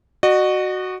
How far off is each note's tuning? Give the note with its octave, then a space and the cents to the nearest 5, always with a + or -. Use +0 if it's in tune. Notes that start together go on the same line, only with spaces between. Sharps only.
F#4 +0 D#5 -40